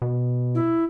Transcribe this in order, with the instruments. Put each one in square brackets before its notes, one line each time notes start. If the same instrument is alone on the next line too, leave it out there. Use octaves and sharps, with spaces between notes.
[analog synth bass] B2
[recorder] E4